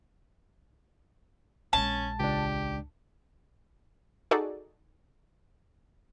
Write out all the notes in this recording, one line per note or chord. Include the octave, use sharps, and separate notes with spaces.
A#1 G#3 C#4 A5
C#2 D4 G4
D#4 F#4 G#4 A4 D5